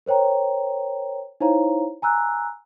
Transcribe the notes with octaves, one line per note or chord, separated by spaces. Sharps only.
A#4 C5 C#5 G5 A#5
D#4 E4 C5 C#5 F5 A#5
G#5 A#5 E6 F#6